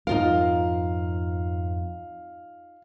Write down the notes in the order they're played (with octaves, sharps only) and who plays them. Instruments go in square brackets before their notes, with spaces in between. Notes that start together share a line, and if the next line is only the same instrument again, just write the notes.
[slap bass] F2 G#2 F3 [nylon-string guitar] D#4 F4 A#4 [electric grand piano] F5